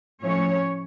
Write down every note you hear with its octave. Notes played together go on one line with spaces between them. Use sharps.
A2 F3 A3 C#4 C#5